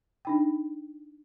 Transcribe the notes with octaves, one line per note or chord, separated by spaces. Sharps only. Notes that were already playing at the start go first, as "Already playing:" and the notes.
D4 D#4 G5